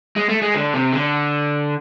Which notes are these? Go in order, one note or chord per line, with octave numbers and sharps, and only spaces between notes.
G#3
A3
G#3
D3
C3
D3